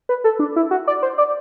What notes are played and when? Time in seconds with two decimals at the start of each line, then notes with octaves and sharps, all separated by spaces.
0.09 B4
0.24 A4
0.39 D4
0.56 E4
0.71 F#4
0.87 D5
1.02 C5
1.18 D5